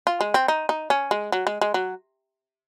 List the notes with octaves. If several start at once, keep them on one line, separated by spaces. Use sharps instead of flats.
F4
G#3
C4
D#4
D#4
C#4
G#3
F#3
G#3
G#3
F#3